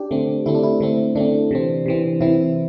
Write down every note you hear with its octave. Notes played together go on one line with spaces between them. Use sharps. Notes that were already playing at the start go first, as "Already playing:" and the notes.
Already playing: D4 G4
D3 A3 C4
D3 A3 C4 E4
D4
E4
D3 A3 C4
D3 A3 C4 D4
C3 E3 C4
C3 E3 C4
C3 E3 C4 E4